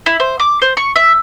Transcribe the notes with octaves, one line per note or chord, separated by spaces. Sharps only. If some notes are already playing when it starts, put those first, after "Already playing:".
E4
C5
D6
C5
C#6
E5